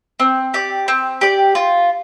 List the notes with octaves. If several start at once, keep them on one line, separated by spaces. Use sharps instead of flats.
C4
G4 D5
C4
G4 D5
F4